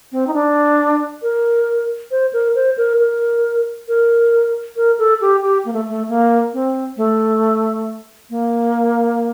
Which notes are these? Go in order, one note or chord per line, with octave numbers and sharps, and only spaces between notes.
C4
D#4
D4
A#4
C5
A#4
C5
A#4
A#4
A#4
A#4
A4
G4
G4
A#3
A3
A3
A#3
C4
A3
A#3